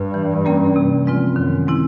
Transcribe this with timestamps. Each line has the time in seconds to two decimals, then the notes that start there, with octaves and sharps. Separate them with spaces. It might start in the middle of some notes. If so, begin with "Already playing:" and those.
Already playing: G2
0.14 E3
0.45 G3 A#3 C#4
0.76 C3
1.05 F3 G#3 C4 F4
1.36 F#2 D#3
1.67 G#3 C4 E4